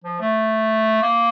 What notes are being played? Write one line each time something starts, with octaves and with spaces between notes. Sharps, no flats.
F3
A3
A#3